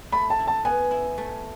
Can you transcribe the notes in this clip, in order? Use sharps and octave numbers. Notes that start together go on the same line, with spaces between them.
A3 B5
A5
E4
A5
B3 G#5
E4
A3